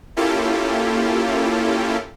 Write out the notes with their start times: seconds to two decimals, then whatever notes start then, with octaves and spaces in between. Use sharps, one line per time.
0.16 A#3 C#4 E4 F4 G4 A4